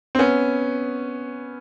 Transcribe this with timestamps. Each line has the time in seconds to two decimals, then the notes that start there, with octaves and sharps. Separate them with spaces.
0.15 C4
0.19 B3 C#4